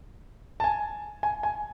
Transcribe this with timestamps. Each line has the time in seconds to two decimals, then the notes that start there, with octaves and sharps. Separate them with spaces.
0.60 A5
0.64 G#5
1.23 G#5
1.43 G#5